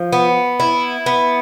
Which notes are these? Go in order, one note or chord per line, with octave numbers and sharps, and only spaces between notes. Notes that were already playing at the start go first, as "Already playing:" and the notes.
Already playing: F3
B3
E4
B3